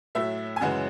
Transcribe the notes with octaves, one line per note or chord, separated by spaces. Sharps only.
A2 F#3 A3 E5
G#5
F#2 C#3 E3 G#3 F#5